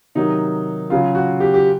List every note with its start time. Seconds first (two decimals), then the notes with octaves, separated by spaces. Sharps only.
0.15 C3 D#3 F#3 D#4
0.90 C#3 F#3 F4
1.15 F#4
1.40 G4
1.54 G4